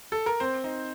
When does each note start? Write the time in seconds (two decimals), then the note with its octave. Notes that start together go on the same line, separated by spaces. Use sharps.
0.12 A4
0.26 A#4
0.40 C4 C5
0.64 D#4